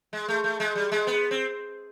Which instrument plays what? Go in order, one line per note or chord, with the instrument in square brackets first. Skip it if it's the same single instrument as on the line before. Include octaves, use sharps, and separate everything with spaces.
[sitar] G#3
A3
A3
G#3
G3
G#3
B3
C4